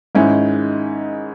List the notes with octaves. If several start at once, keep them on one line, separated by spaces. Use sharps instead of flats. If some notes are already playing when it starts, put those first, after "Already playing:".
G#2 D#3 G#3 C#4 E4